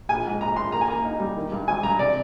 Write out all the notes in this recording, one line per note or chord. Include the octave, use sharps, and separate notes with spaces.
A#1 G#5
G#2
A#1 A#5
A#1 C6
A#3 A#5
G#5
A#3 A#5
D#4
G3
D#3
G2
G#1 G#5
G2 A#5
C3 D5